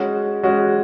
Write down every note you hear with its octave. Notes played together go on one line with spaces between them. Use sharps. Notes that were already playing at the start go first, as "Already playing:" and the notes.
Already playing: G#3 C#4 F#4
G#3 C#4 F#4